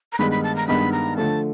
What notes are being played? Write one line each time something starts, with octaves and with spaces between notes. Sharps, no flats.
A#5
G2 D#3 G#3 B3 D#4 B5
B5
A5
A#5
G2 D#3 G#3 B3 D#4 B5
A#5
D3 F3 A3 A5